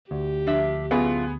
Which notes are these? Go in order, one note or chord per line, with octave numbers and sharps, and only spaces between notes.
D2 G4
F3 D4 E5
F#2 A2 B3 F4 G#4